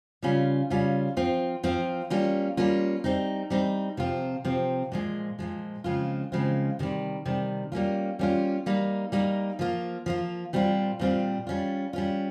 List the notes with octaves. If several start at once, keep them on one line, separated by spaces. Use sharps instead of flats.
C#3 G3 C#4 F4
C#3 G3 C#4 F4
F3 C4 F4
F3 C4 F4
G3 A#3 C#4 F4
G3 A#3 C#4 F4
G3 C4 D#4
G3 C4 D#4
C3 F3 C4 F4
C3 F3 C4 F4
A#2 F3 G#3
A#2 F3 G#3
C#3 F3 G#3 C4 F4
C#3 F3 G#3 C4 F4
C3 D#3 G3
C3 D#3 G3
G3 A#3 C#4 F4
G3 A#3 C#4 F4
G3 A#3 D#4
G3 A#3 D#4
F3 A#3 F4
F3 A#3 F4
A#2 G3 C4 F4
A#2 G3 C4 F4
G3 C#4 F4
G3 C#4 F4